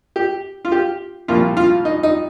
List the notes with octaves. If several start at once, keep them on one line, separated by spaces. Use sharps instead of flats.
G4
F4
G4
C2 A#2 F3 A#3 F4
F4
D#4
D#4